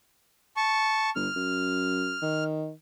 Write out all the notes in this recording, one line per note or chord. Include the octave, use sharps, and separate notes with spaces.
A5 C#6
G1 F6
F#2
D#3